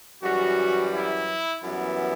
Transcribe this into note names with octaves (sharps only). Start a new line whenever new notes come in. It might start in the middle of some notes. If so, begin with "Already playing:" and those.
F#2 E3 G3 F#4
E4
F#2 E3 G3 B3 E4